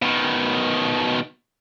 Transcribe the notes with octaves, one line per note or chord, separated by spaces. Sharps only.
B2 D#3